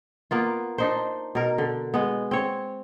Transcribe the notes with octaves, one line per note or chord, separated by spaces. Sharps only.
A#3 B3 F4
D4 D#4 C5
B2 A#4
D3
G#3 B3
C4 C#5